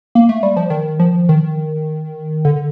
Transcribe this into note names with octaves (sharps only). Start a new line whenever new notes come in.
A#3
A3
G3
F3
D#3
F3
D#3
D3